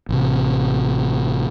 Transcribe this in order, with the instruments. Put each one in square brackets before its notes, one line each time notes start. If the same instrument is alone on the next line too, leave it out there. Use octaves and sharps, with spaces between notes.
[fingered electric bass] A1 C3